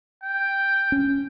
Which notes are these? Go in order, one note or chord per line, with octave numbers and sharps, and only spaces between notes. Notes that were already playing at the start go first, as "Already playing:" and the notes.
G5
C#4